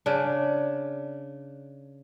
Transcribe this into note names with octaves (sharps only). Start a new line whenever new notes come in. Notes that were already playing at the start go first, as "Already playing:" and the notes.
C#3 D4